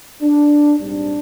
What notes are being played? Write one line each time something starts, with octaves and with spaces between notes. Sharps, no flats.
D4
A#1 G#2 G3 C4 D4